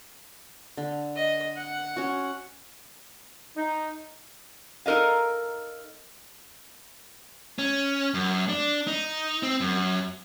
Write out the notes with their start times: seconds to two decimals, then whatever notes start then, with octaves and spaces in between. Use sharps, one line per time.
0.77 D3
1.16 D#5
1.57 F#5
1.97 C#4 F#4
3.56 D#4
4.86 D#4 A4 A#4 D#5 F5
7.59 C#4
8.14 F#2
8.49 D4
8.88 D#4
9.43 C4
9.61 F#2